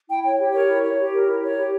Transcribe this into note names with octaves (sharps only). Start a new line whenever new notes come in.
E4 G5
C#5 G5
G4
A#4 C#5
E4
C#5
G4
A#4
E4
C#5
G4